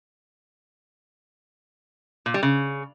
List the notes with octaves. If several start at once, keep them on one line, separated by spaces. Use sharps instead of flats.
A#2
G3
C#3